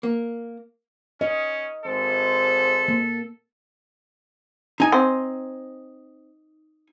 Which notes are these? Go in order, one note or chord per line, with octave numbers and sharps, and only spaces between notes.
A#3
C#4 D#5
G#1 G#3 A4 C5
A#3
D#4 G#5
C4